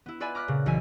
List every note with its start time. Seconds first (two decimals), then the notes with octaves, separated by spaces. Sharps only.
0.06 B3 E4
0.20 F4 B4 D5 E5 G#5 B5
0.35 A#5 D6 F6 F#6 B6
0.48 A#2 C#3
0.66 B1 E3 E5 G#5 B6